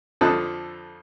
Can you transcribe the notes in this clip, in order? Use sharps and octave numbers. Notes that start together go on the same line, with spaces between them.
F2 D3 F3 A4 D#5 F#6